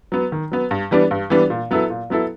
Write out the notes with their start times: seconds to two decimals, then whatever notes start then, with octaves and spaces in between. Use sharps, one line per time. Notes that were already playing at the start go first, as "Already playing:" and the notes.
0.12 F#3 B3
0.32 D#3
0.52 F#3 B3
0.71 G2
0.91 E3 G3 B3 D4
1.11 G2
1.30 E3 G3 B3 D4
1.50 A#2
1.71 F#3 B3 E4 A4
1.90 A#2
2.10 F#3 B3 E4 A4